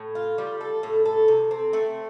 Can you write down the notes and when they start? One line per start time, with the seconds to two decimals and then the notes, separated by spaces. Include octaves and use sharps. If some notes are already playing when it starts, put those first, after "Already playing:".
Already playing: A2
0.15 F4
0.38 G3
0.61 A4
0.83 A2
1.05 A4
1.28 C3
1.51 C4
1.73 A3